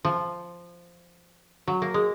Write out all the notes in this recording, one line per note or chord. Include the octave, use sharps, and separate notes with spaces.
F3
F#3
A#3
G#3